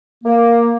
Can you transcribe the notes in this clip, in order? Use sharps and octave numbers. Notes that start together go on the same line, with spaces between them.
A#3